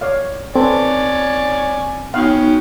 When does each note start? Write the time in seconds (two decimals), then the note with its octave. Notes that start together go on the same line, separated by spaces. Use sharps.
0.01 C#5 D5 F5
0.56 C4 A4 B4 C#5 D5 G#5
2.14 B3 C#4 D#4 F#4 C#5 F5 G5